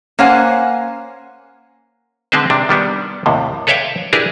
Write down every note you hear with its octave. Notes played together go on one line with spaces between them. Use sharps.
A#3 C#4 C5 F#5 G#5
D3 G#3 C4 B4 C5
C3 D4
D#3 G3 B3 D4
D#2 A2 C3
A4 B4 C#5 E5 F5 G5
D4 E4 G4 G#4 A#4 B4